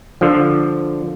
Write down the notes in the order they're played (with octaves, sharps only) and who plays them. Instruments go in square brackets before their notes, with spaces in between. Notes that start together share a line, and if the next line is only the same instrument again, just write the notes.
[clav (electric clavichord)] D3 F3